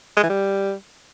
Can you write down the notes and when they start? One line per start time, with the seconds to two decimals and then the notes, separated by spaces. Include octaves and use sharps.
0.17 G#3
0.23 E3
0.30 G3